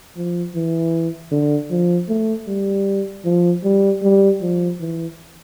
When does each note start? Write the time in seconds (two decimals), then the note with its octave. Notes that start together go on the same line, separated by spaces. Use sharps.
0.16 F3
0.55 E3
1.32 D3
1.70 F3
2.09 A3
2.48 G3
3.25 F3
3.64 G3
4.03 G3
4.42 F3
4.80 E3